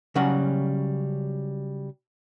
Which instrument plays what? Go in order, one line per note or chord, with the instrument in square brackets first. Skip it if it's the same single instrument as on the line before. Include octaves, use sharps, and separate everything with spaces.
[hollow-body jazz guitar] C#3 F#3 G3 C#4 F#5